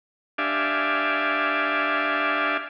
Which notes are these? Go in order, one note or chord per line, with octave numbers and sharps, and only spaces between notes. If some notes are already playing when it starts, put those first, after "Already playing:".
D4 G4 D5 E5 F5 G#5